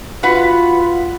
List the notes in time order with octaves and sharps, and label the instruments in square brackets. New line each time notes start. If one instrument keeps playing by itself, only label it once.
[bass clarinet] F4 [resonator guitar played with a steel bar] F#4 B4 F#5